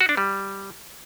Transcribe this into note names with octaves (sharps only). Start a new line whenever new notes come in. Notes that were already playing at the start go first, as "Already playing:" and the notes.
F#4
D4
G3